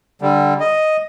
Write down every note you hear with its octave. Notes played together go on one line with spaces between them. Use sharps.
D3 G3
D#5